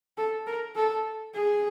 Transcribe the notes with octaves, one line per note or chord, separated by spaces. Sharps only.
A4
A#4
A4
G#4